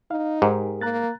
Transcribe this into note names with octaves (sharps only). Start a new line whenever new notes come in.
D#4 F5
G#2 G4 G#4 A#4
A#3 A#5 F#6 A6